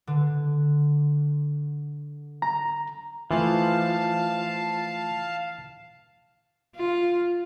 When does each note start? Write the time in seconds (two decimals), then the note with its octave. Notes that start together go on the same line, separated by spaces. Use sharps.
0.07 D3
2.42 A#5
3.31 E3 F3 A3 F4 F5 A5
6.75 F4